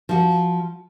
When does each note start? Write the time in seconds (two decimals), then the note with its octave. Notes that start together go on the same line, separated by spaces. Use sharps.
0.09 F3 F#4